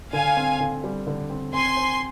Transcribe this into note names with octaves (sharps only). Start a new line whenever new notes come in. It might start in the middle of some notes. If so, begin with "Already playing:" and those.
D3 F5 G#5
C4
D3
G3
D3
C4
C4 G#5 C6
C5